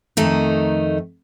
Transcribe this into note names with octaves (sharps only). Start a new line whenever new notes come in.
F2 D#3 A3 D#4